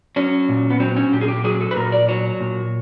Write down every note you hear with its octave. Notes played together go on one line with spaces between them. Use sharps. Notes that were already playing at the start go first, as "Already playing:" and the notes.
F#3 C#4
A#2
B3
F#3 C4
C#4
A#2 G4
G#4
G4
F#3 G#4
A4
B4
A#2 A#4
D5
F#3 C#5
A#2